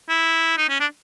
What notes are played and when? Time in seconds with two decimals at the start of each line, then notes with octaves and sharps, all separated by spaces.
0.09 E4
0.58 D#4
0.70 C#4
0.80 D4